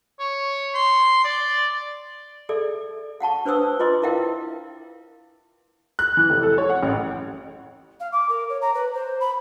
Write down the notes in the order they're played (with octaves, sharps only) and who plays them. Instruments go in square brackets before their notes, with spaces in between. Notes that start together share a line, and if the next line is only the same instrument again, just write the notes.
[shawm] C#5
C6
D5
[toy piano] G#4 A4 D5 E5
F5 F#5 A5 C#6
D4 B4 C5 C#6 D#6 E6
F4 B4 D#5 C6 D6
E4 A#4 E5 F5 G5
[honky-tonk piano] F#6
E3
F1
A4
C#5
F#5
A1
[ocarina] F5
D6
A#4
C#5
A#5
B4
C5
B5